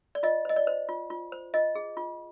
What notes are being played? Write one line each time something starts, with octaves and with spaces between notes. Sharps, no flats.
D5
F4 D#5
C5 D#5
D5
C5
F4
F4
C5
F4 D#5
G#4
F4